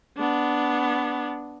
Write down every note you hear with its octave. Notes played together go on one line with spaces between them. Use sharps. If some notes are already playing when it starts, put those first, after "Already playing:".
B3 D4